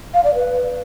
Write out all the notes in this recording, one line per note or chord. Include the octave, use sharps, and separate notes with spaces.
F5
D5
B4